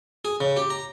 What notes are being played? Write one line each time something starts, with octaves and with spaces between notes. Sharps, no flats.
G#4
C#3
G4
A#5